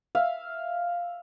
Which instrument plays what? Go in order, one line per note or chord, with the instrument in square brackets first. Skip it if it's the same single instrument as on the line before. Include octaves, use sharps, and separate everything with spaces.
[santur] E5 F5